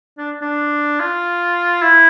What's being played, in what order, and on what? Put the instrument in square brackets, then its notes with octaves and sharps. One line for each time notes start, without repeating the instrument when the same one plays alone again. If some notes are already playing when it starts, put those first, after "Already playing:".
[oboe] D4
D4
F4
E4